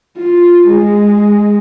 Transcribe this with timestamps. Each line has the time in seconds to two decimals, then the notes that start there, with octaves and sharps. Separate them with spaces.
0.17 F4
0.67 G#3